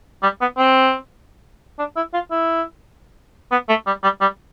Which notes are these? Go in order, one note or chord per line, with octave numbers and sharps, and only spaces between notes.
G3
B3
C4
D4
E4
F4
E4
B3
A3
G3
G3
G3